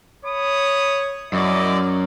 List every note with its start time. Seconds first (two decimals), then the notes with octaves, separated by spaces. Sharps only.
0.24 C#5 B5 D#6
1.33 F#2 E4 D5 D#5